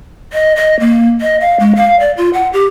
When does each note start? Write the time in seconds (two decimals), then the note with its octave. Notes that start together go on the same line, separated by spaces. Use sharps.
0.33 D#5
0.56 D#5
0.80 A#3
1.21 D#5
1.40 F5
1.60 G#3
1.76 F5
2.00 D5
2.17 F4
2.34 F#5
2.53 G4